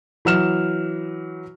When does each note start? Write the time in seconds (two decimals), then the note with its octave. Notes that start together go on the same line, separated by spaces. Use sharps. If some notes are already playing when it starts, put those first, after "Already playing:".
0.25 E3 F#3 F6 E7